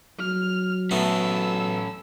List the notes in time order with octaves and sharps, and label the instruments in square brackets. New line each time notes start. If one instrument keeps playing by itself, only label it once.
[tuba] F#3 [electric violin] F6
[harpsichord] A3 B3 D#4 [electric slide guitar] C#4 A4 [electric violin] E6